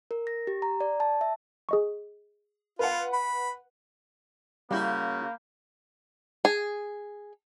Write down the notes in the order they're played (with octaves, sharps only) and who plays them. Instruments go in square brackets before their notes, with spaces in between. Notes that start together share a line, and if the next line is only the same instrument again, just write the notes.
[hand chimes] A#4
A#6
G4
A#5
D5
A5
E5
[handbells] G#4 D#5 C#6
[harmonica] F4 [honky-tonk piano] B4 F#5
[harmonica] B5
[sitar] C#3 F#4 [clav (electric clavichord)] G3 E4 [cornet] A#3 [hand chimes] F5 B5 G6
[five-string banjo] G#4